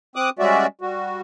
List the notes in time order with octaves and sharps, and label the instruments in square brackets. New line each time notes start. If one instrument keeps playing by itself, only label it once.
[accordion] C4 D6 D#6 F#6
G3 G#3 C#4 F#4 D5 E5
G3 F#4